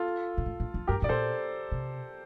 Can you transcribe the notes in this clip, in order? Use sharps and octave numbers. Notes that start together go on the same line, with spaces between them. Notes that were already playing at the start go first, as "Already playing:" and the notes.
Already playing: F4 A4
A#2
A2
A2
F2
G2 G4 A#4
A2 D5
A#2 A4 C5
C3